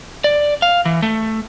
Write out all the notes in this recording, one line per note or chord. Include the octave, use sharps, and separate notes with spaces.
D5
F5
E3
A3